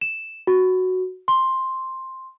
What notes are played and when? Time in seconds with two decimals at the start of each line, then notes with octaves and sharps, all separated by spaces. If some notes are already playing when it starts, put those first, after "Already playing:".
0.01 E7
0.47 F#4
1.28 C6